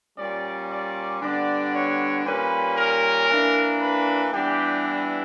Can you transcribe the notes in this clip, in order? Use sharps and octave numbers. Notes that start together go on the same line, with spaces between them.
A#2 G3 C#4 D5
D5
D3 G3 B3 D4 D5
C#5
A#2 G3 A#3 C#4 B4
A#4
E3 A#3 D4
B4
E3 G3 B3 D4 G4
E4